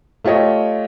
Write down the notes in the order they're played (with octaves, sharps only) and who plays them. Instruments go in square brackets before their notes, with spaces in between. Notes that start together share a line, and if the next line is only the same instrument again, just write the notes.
[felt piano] A3 F4 G4 C#5 D#5